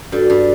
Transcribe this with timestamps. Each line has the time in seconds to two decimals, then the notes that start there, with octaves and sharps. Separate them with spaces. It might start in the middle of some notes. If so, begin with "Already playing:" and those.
0.12 G2 F#4 A4
0.30 G2